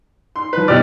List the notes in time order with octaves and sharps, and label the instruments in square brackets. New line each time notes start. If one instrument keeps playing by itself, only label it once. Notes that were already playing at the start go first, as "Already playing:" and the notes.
[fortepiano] C6
F3 B4
[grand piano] B2 D5 [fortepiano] F#3 G4 F6